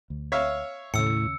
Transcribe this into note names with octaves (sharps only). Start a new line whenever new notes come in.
D2
C#5 E5 F5
D#2 A2 C#3 E6 C#7